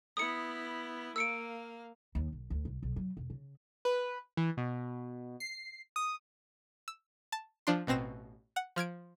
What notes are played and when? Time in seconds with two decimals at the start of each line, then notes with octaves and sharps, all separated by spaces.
0.17 B3 E4 D#6 C#7
1.16 A#3 F5 E6 C#7 D7
2.15 D#2
2.32 B1
2.50 D2
2.65 C2
2.83 B1
2.96 F#3
3.17 E1
3.30 C#3
3.85 B4
4.37 E3
4.57 B2
5.40 C7
5.96 D#6
6.88 E6
7.32 A5
7.67 F3 D4 C6
7.87 A1 B2 C4 A#6 E7
8.56 F#5 F#6
8.76 F3 F6 G#6 D7